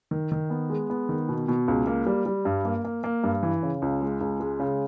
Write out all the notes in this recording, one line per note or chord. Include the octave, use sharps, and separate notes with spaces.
D#3
D#3
B3
G#3
B3
D#3
B2
B2
C#2
A#3
G3
G3
G2
A#3
A#3
A#3
G2
E3
C#3
C#2
G#3
C#2
G#3
C#3